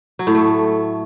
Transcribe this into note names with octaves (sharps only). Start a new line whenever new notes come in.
F#3
A2
A3